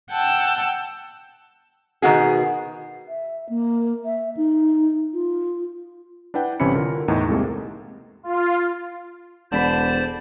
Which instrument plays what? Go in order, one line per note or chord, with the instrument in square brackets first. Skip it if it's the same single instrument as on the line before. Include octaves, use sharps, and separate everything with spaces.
[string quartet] F#5 G5 A5 E6
[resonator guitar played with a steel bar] B2 D#3 A#3 F#4 G#4
[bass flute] E5
A#3
E5
D#4
F4
[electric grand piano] D4 E4 B4 F#5 G5
G1 C3 E3 C#4 B5 C#7
D3 F4 A#4
E2 A2 D#4
C2 C3 G#3 A#3 A4
[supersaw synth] F4
[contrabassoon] E1 [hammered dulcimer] D3 B5 [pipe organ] C5 D5 A5